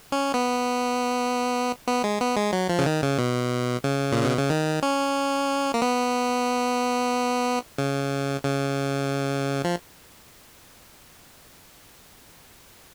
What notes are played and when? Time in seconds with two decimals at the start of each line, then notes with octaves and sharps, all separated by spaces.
0.12 C#4
0.34 B3
1.88 B3
2.04 G#3
2.21 B3
2.36 G#3
2.53 F#3
2.69 F3
2.79 C#3
2.86 D#3
3.03 C#3
3.18 B2
3.84 C#3
4.12 A#2
4.25 B2
4.37 C#3
4.50 D#3
4.82 C#4
5.74 A#3
5.82 B3
7.78 C#3
8.44 C#3
9.64 F3